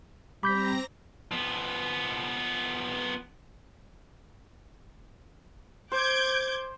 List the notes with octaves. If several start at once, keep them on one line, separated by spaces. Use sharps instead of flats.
G3 C4 A#5 B5 D6 G6 A#6 B6
F3 B3
C5 D6 G6 G#6